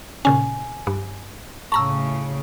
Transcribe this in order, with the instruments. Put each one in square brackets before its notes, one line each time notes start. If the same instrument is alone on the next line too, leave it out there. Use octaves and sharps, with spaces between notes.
[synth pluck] A#2 C#3 C#4 [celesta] G#5
[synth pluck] G2
[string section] A2 C#3 [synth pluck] A5 A#5 E6 [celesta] C#6